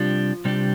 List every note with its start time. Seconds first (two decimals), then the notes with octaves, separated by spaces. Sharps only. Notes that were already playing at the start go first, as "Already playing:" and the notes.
Already playing: C3 F3 G3 D4 G4
0.45 C3 G3 D4 G4